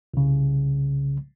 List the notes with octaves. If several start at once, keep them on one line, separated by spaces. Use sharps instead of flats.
C2 C#3